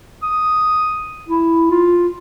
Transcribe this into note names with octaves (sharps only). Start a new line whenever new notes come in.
D#6
E4
F4